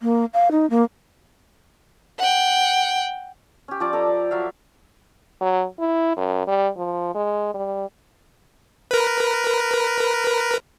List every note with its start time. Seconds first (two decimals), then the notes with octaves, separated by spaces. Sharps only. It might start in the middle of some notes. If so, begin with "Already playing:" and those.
0.01 A#3
0.33 F5
0.51 D#4
0.70 A#3
2.19 F#5 G5
3.68 C#4 G4
3.80 F3 C#4 C5 D5
3.93 A4 D5 D#5 A#5
4.07 D5
4.31 F#3 E5 F5
5.41 F#3
5.80 E4
6.17 F#2
6.47 G3
6.77 F3
7.15 G#3
7.54 G3
8.91 A#4 B4